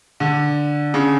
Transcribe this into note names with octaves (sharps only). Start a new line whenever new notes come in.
D3
C#3